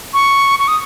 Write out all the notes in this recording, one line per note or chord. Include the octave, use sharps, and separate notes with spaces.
C#6
C#6
D#6